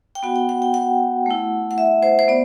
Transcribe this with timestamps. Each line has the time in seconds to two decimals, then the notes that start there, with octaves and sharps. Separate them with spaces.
0.15 G5
0.23 B3 F#4 F#5
0.36 G5
0.49 F#5
0.62 G5
0.74 F#5
1.26 A3 E4
1.71 F#5
1.78 E5
2.03 C5
2.19 C5
2.28 B3 D5